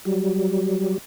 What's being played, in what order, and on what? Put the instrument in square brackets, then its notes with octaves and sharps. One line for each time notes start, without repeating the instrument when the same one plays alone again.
[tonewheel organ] F#3 G3